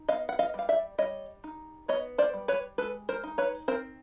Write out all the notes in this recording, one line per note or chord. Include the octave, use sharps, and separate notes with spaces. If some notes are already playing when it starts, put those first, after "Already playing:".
Already playing: D#4
B3 D#5 F5
F#5
D#5 F5
G3 F5
D5 E5
G3 C#5 D#5
D#4
B3 C#5 D#5
C5 D5
G3
B4 C#5
G#3 A4 B4
A#4 C5
D#4
B4 C#5
C4 A#4 C5